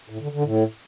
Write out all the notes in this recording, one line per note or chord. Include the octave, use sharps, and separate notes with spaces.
A2
D3
D3
A2